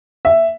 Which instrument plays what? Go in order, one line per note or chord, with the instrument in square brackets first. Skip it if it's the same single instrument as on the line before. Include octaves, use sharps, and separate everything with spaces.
[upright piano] E5